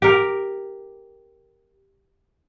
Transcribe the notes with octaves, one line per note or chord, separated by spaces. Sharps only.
G4 A#4